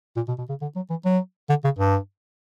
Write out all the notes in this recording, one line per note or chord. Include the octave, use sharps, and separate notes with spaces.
A#2
B2
B2
C#3
D3
F#3
E3
F#3
D3
C#3
G2